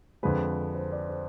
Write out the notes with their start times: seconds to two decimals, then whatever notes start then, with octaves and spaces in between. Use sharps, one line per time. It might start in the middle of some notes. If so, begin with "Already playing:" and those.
0.23 F2 D3 F3 G#3 B4
0.75 C5
0.92 D5
1.09 C5